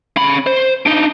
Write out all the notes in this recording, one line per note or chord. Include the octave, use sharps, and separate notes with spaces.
C#4 B5
C5
D4 D#4